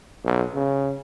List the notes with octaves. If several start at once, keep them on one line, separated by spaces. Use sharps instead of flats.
B1
C#3